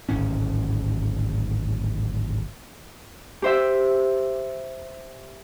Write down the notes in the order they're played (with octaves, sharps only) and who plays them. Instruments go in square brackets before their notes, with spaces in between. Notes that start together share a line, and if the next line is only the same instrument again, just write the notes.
[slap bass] D1 G#1 C#4
[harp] G4 C5 E5